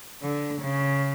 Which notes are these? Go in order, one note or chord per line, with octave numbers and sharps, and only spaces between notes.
D3
C#3